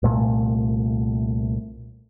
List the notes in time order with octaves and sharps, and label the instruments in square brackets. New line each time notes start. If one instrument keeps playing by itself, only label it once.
[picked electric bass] C2 A#2 A3